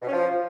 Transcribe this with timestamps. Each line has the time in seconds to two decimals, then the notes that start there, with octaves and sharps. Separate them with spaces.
0.02 B2
0.07 C#4
0.13 F3